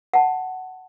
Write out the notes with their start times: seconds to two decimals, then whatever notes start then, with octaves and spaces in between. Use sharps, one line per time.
0.14 F#5 A5